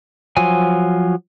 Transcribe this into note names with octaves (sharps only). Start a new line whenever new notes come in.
F3 F#3 G#5